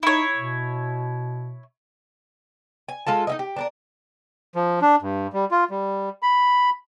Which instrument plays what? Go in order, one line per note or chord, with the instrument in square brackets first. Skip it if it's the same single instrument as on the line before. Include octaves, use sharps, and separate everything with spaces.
[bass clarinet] D#4 [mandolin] E4 C#5
[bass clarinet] B2
[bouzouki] G#5
G#3 F4 A4 A5
D#4 E4 D#5
G4
D4 A4 A#4
[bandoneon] F3
D4
G2
G3
F4
G3
B5